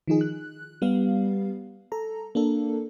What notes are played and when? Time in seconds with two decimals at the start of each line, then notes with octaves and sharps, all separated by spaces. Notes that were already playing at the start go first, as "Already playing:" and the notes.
0.08 D#3 F3 D#4 G#4
0.21 F#6
0.82 G3 B3 F5
1.92 A4 A#5
2.35 A#3 D4 A4